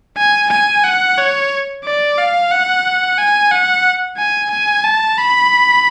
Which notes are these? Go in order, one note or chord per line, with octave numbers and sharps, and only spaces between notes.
G#5
G#5
F#5
C#5
D5
F5
F#5
G#5
F#5
G#5
G#5
A5
B5